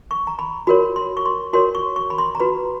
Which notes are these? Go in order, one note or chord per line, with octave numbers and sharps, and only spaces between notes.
C#6
A#5
B5
F#4 A#4 C#5 B5
C6
C#6
C6
F#4 A#4 C#5 C6
C#6
C#6
B5
C6
A#5
F#4 B4 B5